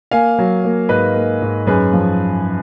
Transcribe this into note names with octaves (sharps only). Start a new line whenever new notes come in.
A#3 F5 G#5
F#3
A#3
G#2 B4 D#5
A#3
G#2
F#2 G#4 B4
F3